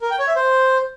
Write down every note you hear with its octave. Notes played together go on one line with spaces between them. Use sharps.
A#4
G5
C#5
E5
C5